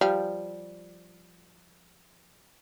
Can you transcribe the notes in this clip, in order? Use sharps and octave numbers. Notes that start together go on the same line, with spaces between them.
F3 G3 F5